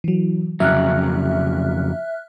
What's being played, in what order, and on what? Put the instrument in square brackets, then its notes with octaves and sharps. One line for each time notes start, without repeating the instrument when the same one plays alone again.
[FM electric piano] E3 F#3
[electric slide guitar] F2 C#3 F#3 [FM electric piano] E5 F6 F#6